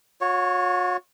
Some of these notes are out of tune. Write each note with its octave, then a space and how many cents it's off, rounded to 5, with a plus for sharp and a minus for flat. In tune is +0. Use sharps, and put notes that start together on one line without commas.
F#4 -45 C#5 +0